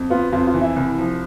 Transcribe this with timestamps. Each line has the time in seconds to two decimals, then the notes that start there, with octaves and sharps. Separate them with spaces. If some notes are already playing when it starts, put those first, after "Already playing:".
Already playing: F2
0.10 B3 F4 F5
0.32 F2 F4 F5
0.47 F4 F5
0.54 E3
0.61 E4 E5
0.76 C2
0.98 F3